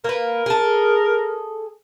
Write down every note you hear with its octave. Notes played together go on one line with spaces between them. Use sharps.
A#3 A#4 B4
G#4 A4